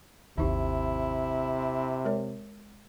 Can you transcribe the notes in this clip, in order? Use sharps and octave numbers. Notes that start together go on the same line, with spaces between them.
G#1 D#2 C3 D#4 E4 G4
G#3 A#4 C#5